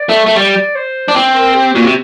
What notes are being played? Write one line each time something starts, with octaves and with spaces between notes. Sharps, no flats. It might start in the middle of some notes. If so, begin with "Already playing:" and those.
Already playing: D5
A3
A3
G3 D5
C5
D4
C4
A#4
G4
A#2 F#4
C3